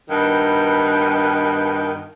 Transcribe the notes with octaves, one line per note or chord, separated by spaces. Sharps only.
G2 B2 D#3